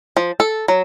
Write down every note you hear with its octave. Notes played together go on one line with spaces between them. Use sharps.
F3
A4
F#3